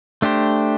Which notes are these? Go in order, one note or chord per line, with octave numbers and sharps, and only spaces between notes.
A3 D4 G4 C5